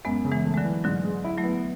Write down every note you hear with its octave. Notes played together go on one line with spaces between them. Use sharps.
F#2 G#3 B3
C#3
E3 G#3
A3
G#3
D3 F#3
E3
G#2 D3 F#3
G#3
E4
F#3 A3
B3